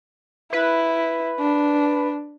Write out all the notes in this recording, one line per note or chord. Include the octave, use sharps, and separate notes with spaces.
E4 B4
D4